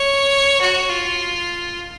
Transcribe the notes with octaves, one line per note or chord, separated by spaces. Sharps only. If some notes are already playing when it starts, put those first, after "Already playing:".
Already playing: C#5
F#4
F4